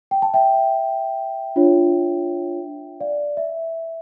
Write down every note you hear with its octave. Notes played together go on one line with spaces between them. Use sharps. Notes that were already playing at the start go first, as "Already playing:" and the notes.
G5
A5
E5 G5
D4 F4 C#5
D5 F5
E5